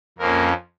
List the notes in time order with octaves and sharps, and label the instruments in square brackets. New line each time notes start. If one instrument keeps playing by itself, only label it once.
[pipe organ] F2 F3 A#3 C#4 A#4